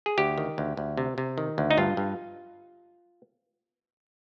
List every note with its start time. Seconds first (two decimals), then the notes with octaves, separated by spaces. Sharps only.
0.06 G#4
0.18 D2 G4
0.38 D#3
0.58 D2
0.77 D2
0.97 C3
1.18 C3
1.38 D#3
1.58 D2
1.71 D#4
1.77 G2 F4
1.97 G2